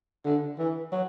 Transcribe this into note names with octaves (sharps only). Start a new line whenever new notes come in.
D3
E3
F#3